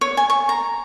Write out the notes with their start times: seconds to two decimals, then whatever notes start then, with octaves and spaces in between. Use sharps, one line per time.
0.01 C#5
0.17 G#5
0.30 C#6
0.49 A#5